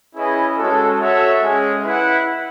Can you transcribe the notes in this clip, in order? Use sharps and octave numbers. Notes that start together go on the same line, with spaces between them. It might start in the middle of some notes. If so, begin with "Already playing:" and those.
C#4 E4 G#4 B4 D#5
G#3 C#4 F#4 A4
F#4 A4 C#5 E5
G#3 C#4 G#4
E4 B4 F#5